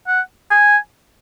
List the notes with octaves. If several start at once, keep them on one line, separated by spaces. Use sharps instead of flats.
F#5
G#5